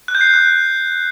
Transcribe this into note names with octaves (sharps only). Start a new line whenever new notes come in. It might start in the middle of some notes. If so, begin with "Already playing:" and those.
F#6
G6
C7
G6
F#6